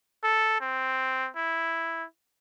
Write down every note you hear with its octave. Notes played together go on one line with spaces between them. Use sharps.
A4
C4
E4